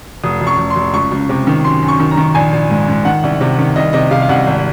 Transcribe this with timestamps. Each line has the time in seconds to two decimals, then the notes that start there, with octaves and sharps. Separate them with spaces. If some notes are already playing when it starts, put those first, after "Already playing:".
0.24 F1 D#6
0.41 F1
0.47 C#6
0.59 F1
0.70 C6
0.76 F1
0.94 C#2 C#6
1.11 C#2
1.29 C3
1.47 D#3
1.64 F#2 C6
1.82 F#2
1.88 C#6
2.00 D#3
2.11 A#5
2.17 D#3
2.35 A#1 G#5
2.53 A#1
2.70 G#2
2.88 G#2
3.05 D#3 F#5
3.23 C2
3.41 C3
3.59 D#3
3.76 C2 D#5
3.93 C3 D#5
4.11 C3 F5
4.22 F5
4.29 C2 F#5
4.46 G#1